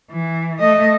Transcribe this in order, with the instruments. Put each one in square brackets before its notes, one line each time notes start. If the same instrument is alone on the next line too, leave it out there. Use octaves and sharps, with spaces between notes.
[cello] E3
A3 D#5